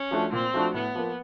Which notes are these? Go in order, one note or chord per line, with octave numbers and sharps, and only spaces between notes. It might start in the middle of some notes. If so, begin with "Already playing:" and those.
Already playing: C#4
F3 A3 D4 F#4
A#2 C4
F3 A3 D4 F#4
A2 B3
F3 A#3